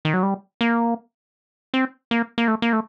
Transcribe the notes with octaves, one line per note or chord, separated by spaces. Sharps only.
D#3
F#3
G3
A#3
C4
A#3
A#3
A3
A#3
A3